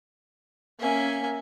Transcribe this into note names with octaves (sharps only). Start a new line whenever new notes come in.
A#3 C#4 E5 G#5